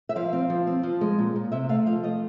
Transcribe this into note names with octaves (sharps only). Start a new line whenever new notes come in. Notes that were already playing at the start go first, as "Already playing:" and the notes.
E5
F3 F5
C4
F3
C4
F3
G#3
A#2
A#2
C3 E5
A3 F5
F3 F5
A3 D#5